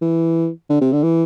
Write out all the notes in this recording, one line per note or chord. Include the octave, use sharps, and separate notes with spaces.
E3
D3
C3
D3
E3